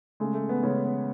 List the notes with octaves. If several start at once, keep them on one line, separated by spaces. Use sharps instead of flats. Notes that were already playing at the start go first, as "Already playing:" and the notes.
C#3 G#3 A3
A3
B3
C#3 G#3 C#4
B3